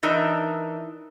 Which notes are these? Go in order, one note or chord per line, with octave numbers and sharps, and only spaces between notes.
E3 D4 D#4 A#4 E5 A#5